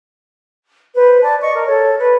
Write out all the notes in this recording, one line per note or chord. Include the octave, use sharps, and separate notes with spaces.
B4 C5
D5 A5
D#5 C#6
A#4
A4 C#5
B4 D5